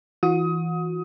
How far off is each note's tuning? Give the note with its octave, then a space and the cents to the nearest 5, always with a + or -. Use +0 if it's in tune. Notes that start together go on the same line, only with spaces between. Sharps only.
E3 +0 F#4 -35 D#6 +25